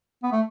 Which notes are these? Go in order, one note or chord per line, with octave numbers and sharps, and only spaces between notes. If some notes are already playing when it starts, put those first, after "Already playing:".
B3
A3